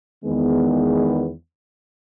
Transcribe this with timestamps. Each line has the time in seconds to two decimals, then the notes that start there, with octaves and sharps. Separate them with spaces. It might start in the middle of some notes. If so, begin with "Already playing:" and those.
0.25 E2 D#3 G#3 B3